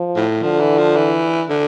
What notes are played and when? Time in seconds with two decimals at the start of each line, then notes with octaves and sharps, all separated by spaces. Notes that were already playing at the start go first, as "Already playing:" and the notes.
Already playing: F3
0.16 A2
0.43 D3 F3
0.60 E3
0.78 F3
0.96 E3
1.49 D3